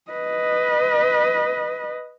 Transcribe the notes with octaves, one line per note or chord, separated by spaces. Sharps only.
B4 D#5